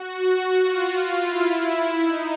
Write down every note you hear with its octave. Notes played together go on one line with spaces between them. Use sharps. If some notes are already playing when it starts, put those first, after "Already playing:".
Already playing: F#4
F4
E4
D#4